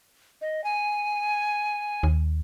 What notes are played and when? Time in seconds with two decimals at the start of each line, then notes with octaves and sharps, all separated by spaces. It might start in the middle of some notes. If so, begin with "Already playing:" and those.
0.42 D#5
0.64 G#5
2.03 D#2